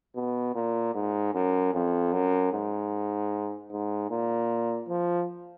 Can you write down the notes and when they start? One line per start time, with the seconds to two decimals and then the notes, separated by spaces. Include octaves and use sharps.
0.15 B2
0.55 A#2
0.95 G#2
1.34 F#2
1.74 F2
2.12 F#2
2.52 G#2
3.71 G#2
4.10 A#2
4.89 F3